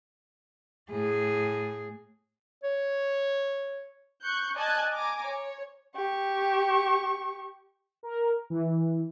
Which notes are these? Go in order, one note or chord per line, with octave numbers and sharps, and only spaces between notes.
A2 G#4
C#5
C#6 F#6 G6
D5 D#5 G#5 A5 F#6 G#6
G#5 A#5 D6
C#5
G4 C#6
A#4
E3